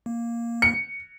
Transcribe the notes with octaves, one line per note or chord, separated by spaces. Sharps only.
A#3
C#7